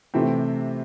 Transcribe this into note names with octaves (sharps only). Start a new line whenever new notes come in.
C3 E3 A3 C4